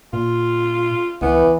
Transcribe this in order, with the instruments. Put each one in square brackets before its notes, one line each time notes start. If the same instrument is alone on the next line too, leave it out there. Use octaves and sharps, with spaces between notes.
[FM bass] A#2 [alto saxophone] F4
[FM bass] C#2 [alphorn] E3 [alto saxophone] B3